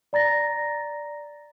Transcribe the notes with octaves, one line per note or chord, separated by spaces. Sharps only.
D5 A#5 A6 A#6